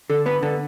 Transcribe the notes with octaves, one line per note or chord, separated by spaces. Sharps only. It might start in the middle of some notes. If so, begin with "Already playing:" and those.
D3 A4
B3 B4
D3 A4